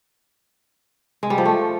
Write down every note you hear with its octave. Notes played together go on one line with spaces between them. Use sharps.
G#3
G3
F3
A3